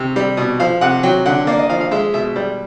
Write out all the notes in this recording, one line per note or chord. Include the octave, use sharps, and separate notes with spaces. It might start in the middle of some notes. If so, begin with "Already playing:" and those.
Already playing: C3
G3
B2
F3 F5
C3 F#5
F#3 G5
D3 F#5
A#3 D5
D#5
F3 F5
F5
G#3 E5
B2 E5
G3